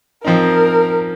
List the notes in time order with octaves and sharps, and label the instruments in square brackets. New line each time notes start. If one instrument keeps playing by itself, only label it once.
[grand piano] F3 C4 D#4 [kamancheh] A#4